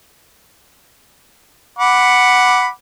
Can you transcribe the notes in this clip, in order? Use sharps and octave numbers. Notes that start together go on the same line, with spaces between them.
F#5 B5 D6